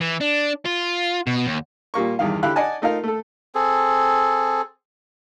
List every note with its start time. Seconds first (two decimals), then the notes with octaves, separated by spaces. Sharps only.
0.01 E3
0.20 D4
0.65 F4
1.27 B2
1.47 D#2
1.94 A#2 G3 A#3 C#6
2.19 E2 G2 D#3 F5
2.43 D3 E4 G4 F5 B5 F#6
2.56 D5 D#5 F#5 G#5 A5
2.82 A3 D#4 F4 A#4 F5
3.03 A3 A4
3.55 C4 G#4 A4